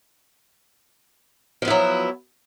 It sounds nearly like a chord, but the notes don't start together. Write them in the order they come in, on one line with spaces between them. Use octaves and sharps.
F3 B3 E4 F#3